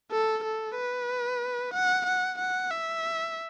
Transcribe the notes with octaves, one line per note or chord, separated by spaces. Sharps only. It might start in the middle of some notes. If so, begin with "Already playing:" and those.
A4
A4
B4
F#5
F#5
F#5
E5